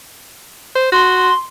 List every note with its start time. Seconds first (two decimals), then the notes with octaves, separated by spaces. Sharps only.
0.75 C5
0.92 F#4 C6